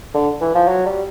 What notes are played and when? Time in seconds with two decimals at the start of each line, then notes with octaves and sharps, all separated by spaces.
0.14 D3
0.41 E3
0.55 F3
0.68 F#3
0.86 G3